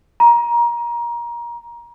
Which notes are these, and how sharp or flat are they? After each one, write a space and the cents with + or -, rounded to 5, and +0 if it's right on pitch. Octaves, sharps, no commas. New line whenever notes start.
A#5 +25